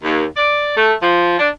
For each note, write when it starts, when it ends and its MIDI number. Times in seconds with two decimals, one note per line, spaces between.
0.04 0.25 39
0.37 0.72 74
0.77 0.94 57
1.02 1.38 53
1.39 1.50 62